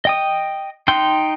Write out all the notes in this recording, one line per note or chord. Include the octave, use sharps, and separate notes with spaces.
D#5 G5 D#6
D#4 G5 C6 F#6 G6